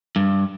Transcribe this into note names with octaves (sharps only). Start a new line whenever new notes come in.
G2